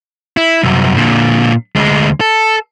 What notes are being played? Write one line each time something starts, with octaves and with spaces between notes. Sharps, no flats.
E4
C2 F#2
A#2 D3
D2 G#3
A4